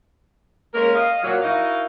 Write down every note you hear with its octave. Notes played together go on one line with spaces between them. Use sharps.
G#3 A#3 C#4 A#4
D#5 F5
A#2 F#3
D#4 E4 F#4 A#4 D#5 F5